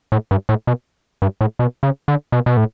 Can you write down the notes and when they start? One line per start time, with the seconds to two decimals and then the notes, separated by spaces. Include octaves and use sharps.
0.12 A2
0.31 G2
0.49 A2
0.67 B2
1.22 G2
1.41 A2
1.59 B2
1.83 C#3
2.08 D3
2.32 B2
2.46 B2
2.57 A2